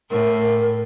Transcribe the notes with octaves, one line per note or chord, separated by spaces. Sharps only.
A2 A#4